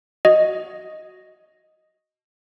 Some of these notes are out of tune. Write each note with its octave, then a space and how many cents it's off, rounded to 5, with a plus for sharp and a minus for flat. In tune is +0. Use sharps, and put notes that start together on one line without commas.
F#4 +0 D#5 +0